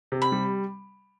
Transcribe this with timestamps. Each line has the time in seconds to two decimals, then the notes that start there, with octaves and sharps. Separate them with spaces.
0.12 C3
0.22 B5
0.32 G3